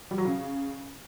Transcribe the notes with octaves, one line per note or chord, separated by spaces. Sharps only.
G3
F#3
C#3